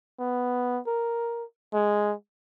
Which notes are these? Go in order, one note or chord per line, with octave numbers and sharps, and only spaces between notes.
B3
A#4
G#3